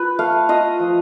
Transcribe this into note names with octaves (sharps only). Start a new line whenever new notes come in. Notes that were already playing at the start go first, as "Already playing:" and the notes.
Already playing: F4 B4
A3 F5
F4 D#5
F3